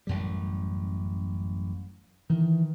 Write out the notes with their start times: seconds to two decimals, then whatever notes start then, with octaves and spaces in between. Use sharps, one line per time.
0.07 A1 F#2 G3
2.30 D#3 E3